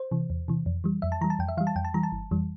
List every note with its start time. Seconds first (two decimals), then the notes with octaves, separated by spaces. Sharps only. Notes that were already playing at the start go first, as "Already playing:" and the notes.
Already playing: C5
0.11 C3 E3
0.30 E2
0.48 C3 E3
0.66 F2
0.84 E3 G3
1.02 F2 E5
1.12 A5
1.21 E3 G3 A#5
1.30 A5
1.39 F2 G5
1.48 E5
1.57 E3 G3 F5
1.67 A5
1.76 F2 G5
1.85 A5
1.94 E3 G3 A#5
2.03 A5
2.12 G1
2.31 F2 E3 G3